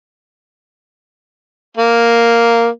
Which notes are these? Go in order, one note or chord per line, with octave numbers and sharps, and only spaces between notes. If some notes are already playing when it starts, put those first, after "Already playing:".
A#3